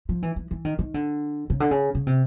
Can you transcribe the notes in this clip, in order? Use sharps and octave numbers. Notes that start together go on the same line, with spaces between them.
F3
E3
E3
E3
D#3
D#3
D3
C#3
D3
C#3
C#3
C3